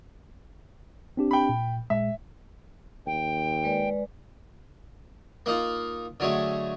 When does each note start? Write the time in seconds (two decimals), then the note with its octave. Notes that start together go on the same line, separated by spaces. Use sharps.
1.17 C4 D4 G4
1.31 G5 B5
1.49 A#2
1.90 A#2 G#3 E5
3.06 D#2 G5
3.64 G#3 B4 D5
5.46 A#3 D#4 F4
6.20 D3 F#3 G#3 A3